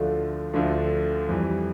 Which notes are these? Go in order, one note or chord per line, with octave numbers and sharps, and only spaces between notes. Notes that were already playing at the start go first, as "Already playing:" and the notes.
Already playing: D2 D3 F3 A3 D4
D2 D3 F3 A3 D4
F2 E3 G3